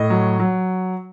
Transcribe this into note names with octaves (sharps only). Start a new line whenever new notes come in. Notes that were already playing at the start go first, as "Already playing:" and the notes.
Already playing: A2 D#5
F#3
F#3